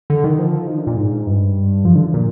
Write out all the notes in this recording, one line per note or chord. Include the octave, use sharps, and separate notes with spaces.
D3
D#3
F3
D#3
D3
A#2
G#2
G2
F3
D3
A#2